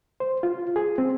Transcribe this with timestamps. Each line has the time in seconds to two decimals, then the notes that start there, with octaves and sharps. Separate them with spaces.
0.20 C5
0.43 F4
0.76 G#4
0.98 C4